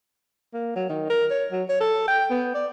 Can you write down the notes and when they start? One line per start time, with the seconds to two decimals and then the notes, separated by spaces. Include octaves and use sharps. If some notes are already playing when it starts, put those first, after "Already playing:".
0.54 A#3
0.76 F#3
0.89 D#3
1.10 A#4
1.31 C#5
1.51 F#3
1.69 C#5
1.80 A4
2.08 G5
2.30 B3
2.54 D5